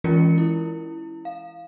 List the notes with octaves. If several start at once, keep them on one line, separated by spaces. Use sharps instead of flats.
E3 G#3 C#4 F4 A#4 C#7
E4
F5